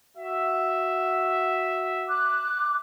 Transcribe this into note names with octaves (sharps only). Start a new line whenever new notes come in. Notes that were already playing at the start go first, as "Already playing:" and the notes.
F#4 E5
D6 F#6